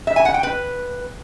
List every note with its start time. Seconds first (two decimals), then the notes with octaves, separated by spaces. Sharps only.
0.07 E5
0.16 G#5
0.25 F#5
0.34 G5
0.43 B4